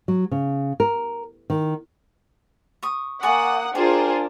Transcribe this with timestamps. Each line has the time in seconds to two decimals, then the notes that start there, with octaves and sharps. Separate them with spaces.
0.08 F#3
0.31 C#3
0.80 A#4
1.50 D#3
2.83 C#6 D#6
3.23 A#3 D5 F#5 G#5 C#6 D#6
3.75 D4 F4 G4 G#4 A#4 C5